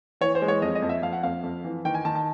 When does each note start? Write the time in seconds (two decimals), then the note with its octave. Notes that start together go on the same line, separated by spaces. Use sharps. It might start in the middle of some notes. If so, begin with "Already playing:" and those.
0.21 E3 C#5
0.35 C5
0.42 G#3
0.48 C#5
0.62 F2 D#5
0.75 D#5
0.82 F2
0.89 E5
1.02 F2 F5
1.13 F#5
1.23 F2 F5
1.43 F2
1.64 E3
1.85 D#3 G5
1.94 G#5
2.05 D#3 A5
2.15 A5